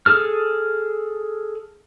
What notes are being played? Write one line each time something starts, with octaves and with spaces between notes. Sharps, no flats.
G#4 A4 F6